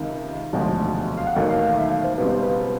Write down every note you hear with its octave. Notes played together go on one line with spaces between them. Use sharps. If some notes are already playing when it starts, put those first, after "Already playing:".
Already playing: C#2 C3 D#3
E1 D2 C3 F3 G#3
F5
F#5
E1 D#2 D#3 F#3 A3 G5
F5
F5
E5
F5
C5
C#2 B2 G3 C4 B4
C5
B4